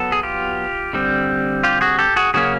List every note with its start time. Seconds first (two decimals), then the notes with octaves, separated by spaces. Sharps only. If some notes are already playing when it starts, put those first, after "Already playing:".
Already playing: F#3 B3 A4
0.12 G#4
0.23 F4 G4
0.93 D3 G3 C4
1.64 F4 G4
1.81 F#4 G#4
1.99 G4 A4
2.16 F#4 G#4
2.34 C#3 F#3 A#3 C#4 F#4 G#4